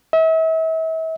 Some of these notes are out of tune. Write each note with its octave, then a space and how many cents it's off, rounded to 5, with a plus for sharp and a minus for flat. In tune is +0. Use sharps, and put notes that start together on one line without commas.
E5 -40